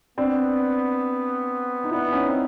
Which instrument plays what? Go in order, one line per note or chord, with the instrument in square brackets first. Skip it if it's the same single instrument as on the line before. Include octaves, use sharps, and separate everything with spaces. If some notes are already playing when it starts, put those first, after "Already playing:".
[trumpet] B3 [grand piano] C4 D4
[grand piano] D#4
[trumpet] B3 [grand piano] D4 E4
[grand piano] C#4 D#4
C4